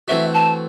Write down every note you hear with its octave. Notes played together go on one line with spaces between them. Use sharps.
E3 A3 C4 F#4 E5
A5